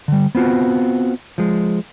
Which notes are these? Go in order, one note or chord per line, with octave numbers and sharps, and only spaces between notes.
D3 G3
B3 C4 F4 F#4
F3 G#3